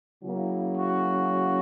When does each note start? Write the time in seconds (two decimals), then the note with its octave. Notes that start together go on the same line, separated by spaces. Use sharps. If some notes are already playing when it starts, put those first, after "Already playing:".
0.22 C#3 F#3 A#3 C#4 E4
0.78 F#4